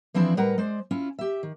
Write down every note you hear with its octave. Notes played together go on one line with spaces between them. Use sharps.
E3 F3 C4 D4 E4 G#4
A2 G3 A#4 B4 F#5 A#5
G#3 C5 D5
C#4 E4 F4
G4 E5
D#3